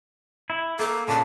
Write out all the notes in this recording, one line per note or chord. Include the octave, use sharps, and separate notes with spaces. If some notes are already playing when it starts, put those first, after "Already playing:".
E4
A#3 A4
A#2 C#3 A5